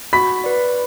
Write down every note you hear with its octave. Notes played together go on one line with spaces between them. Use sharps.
F#4 B5 B6
B4 D5